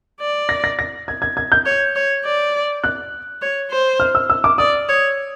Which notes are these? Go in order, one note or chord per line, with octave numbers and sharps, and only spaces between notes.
D5
A#6
A#6
A#6
G#6
G#6
G#6
G6
C#5
C#5
D5
F#6
C#5
C5
F6
E6
E6
D6
D5 D#6
C#5